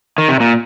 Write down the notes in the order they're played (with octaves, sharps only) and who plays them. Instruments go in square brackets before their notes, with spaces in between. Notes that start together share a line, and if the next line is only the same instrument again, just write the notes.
[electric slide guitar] D#3
C3
A#2